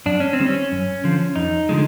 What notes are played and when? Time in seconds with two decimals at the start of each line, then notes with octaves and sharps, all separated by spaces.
0.06 F#2 D4
0.20 C#4
0.33 C4
0.39 D#3 G3
0.46 C#4
0.72 F#2
1.04 D3 F3
1.36 F2 D#4
1.69 D3 F3 G#3